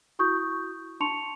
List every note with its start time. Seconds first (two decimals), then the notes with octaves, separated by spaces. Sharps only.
0.19 E4 F#4 C#6 D#6 G6
1.00 D4 A5 C6 C#6 C#7 F7